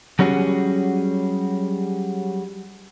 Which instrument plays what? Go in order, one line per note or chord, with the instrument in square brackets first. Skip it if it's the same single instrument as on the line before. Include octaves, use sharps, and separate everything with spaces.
[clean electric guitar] F#3 G3 C#4 F#4 G#4